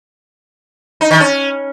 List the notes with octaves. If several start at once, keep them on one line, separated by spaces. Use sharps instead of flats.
D#4
D#3
C#4